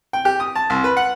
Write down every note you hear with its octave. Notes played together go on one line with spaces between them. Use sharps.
G5
G4
D#6
A5
C2
B4
F#5